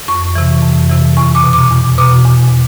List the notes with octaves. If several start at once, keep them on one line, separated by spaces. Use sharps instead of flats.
F2 C#6
C3 E3
F2
C3 E3
E2 C#6
D6
B2
D6
E2
B2 D6
E2